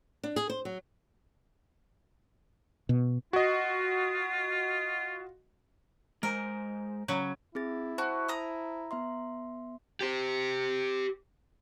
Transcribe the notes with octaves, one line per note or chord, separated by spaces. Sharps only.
D4
G#4
C5
F#3
B2
F4 F#4 D#5
G#3 A#4 C5 G#5
C#3 F#3
C4 E4 G#4 A6
F#4 C5 A5
A#5 D#6
B3 E5 C6
G4 C5